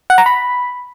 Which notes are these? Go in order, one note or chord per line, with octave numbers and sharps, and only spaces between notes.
F#5
A#5
B5